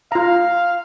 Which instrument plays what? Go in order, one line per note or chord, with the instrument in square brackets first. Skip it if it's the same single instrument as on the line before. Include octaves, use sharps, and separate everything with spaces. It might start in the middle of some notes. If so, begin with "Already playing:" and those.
[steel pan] F4 A#5 [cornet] F5